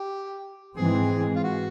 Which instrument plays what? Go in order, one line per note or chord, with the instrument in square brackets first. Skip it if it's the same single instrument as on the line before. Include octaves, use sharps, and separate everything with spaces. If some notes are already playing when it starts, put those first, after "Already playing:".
Already playing: [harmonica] G4
[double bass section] G#2 E3 G#3 C4 [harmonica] G#4
[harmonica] F4
F#4